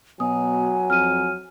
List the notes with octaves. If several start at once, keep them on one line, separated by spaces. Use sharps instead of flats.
B2 F#3 G#5 D#6
F2 F6 D#7